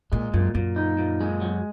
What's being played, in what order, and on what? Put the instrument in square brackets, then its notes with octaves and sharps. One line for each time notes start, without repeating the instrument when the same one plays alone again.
[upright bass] A#2 [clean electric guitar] G#3
[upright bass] F#2 [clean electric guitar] A#2
[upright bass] F#2 [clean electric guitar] A#2
[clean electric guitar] D#4
A#2
G#3
F#3